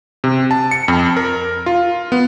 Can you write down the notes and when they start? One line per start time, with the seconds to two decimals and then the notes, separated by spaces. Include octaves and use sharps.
0.24 C3
0.51 A5
0.71 C#7
0.88 F2
1.17 A#4
1.66 F4
2.12 B3